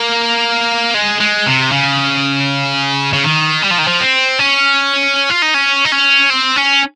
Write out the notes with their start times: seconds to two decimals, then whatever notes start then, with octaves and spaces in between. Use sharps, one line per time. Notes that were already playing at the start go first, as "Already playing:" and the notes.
Already playing: A#3
0.94 G#3
1.20 G#3
1.46 C3
1.71 C#3
3.13 C#3
3.24 D#3
3.62 G3
3.71 F3
3.78 D#3
3.87 F3
4.01 C4
4.39 C#4
5.30 F4
5.42 D#4
5.54 C#4
5.85 D#4
5.92 C#4
6.30 C4
6.56 C#4